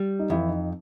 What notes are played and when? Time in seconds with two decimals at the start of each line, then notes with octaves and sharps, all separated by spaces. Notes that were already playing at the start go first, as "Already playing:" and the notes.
Already playing: G3
0.19 D#4
0.30 F2 E3 E4
0.49 D#4